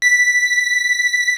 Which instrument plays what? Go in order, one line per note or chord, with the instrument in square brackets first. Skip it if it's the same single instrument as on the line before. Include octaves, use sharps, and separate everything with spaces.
[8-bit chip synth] B6